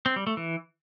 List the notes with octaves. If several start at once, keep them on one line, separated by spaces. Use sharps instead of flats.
C4
G3
A3
E3